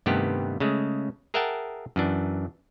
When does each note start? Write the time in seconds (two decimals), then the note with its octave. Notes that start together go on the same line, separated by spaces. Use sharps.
0.06 G2 C3 D#3 A3 B3 G4
0.60 C#3 G#3 A3
1.34 G#4 A#4 E5 F#5 G5 A5
1.96 F#2 E3 D4